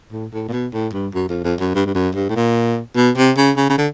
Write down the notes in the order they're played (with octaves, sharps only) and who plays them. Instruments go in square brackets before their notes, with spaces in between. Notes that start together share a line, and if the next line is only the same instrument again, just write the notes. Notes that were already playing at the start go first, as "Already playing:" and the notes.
[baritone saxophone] A2
A2
A#2
B2
A2
G2
F#2
F2
F2
F#2
G2
G2
F#2
G2
A2
A#2
B2
C3
C#3
C#3
C#3
D3